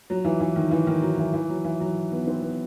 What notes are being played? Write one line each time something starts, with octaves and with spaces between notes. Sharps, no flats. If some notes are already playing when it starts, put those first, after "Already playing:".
F#3
E3
E3
D#3
E3
D#3
F#3
E3
E3
F#3
E3
F#3
B3
C4
B3